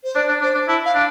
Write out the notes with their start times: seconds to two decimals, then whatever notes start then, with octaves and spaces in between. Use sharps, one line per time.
0.04 C5
0.15 D4 D5
0.28 D4
0.41 D4 C5
0.54 D4
0.68 E4 A5
0.85 F5
0.95 D4